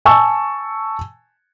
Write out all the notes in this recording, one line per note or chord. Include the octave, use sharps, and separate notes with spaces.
G#5 A5 C#6 E6